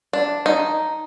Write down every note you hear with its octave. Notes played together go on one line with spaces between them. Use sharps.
D4
D#4